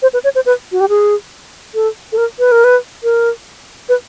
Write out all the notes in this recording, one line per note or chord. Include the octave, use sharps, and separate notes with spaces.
C5
B4
C#5
C5
B4
F#4
G4
G#4
A4
A4
A#4
B4
A#4
B4
A#4
B4